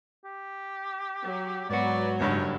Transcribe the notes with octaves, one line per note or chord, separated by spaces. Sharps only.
G4
F#3
G#2 F#3 B3 F#4 B4 D5
F#1 G2 F#3 D#4 C#5